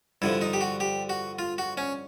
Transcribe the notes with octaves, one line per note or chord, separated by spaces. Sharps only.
G2 D3 F3 E4
D#4
G4
F#4
G4
F#4
F4
F#4
C#4